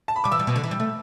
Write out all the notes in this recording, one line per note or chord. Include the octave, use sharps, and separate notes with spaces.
A5
B5
G3 D6
E3 E6
G3
B2
D3
E3
G3
A3